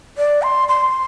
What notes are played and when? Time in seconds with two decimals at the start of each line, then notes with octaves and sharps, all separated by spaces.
0.17 D5
0.42 C6
0.68 C6